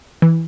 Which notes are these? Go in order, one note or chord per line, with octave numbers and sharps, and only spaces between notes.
E3